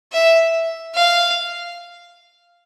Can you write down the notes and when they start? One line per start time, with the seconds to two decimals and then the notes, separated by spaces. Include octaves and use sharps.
0.12 E5
0.95 F5